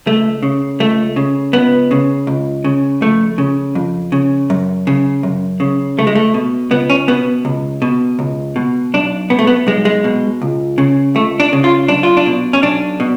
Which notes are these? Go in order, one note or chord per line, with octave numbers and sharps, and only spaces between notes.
C#2 A3
C#3
C#2 A3
C#3
C#2 B3
C#3
C#2
C#3
F2 A3
C#3
F2
C#3
F#2
C#3
F#2
C#3
C#2 A3
G#3
A3
B2
C#2 B3
C#4
B2 B3
C#2
B2
C#2
B2
B1 D4
B2 B3
A3
B3
B1 G#3
G#3
B2
C#2
C#3
C#2 A3
D4
C#3
F4
B1 D4
F4
D4
B2
C#4
B1 D4
B2